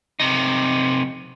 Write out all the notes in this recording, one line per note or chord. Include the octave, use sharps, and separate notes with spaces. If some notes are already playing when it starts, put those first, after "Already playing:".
C3 D#4